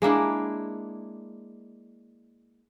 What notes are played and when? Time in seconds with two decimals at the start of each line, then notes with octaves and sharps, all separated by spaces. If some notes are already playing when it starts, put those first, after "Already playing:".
0.02 G#3 A#3 D4 E4